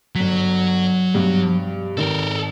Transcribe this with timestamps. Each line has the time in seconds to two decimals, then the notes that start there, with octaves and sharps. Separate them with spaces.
0.15 G1 F#3 B6
1.14 G2 B2
1.97 G#1 D#3 A4 A#4